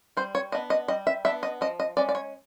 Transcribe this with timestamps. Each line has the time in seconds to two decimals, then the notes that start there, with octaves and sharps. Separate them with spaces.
0.17 G3 C5
0.35 C#5
0.52 B3 D4 D#5
0.70 D#5
0.88 G3 D#5
1.07 E5
1.25 B3 D4 E5
1.43 D#5
1.61 F3 D#5
1.80 D#5
1.97 G#3 C#4 D5
2.09 D5
2.15 C#5